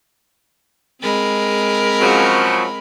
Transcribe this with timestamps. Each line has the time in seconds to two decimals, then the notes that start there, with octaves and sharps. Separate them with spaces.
1.02 G#3 C4 A#4 B5
2.00 C#3 F3 F#3